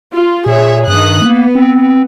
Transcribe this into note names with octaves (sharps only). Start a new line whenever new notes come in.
F4
A#2 G#4 C#5 E5
G2 D#3 D#6 F#6
A#3 B3
C4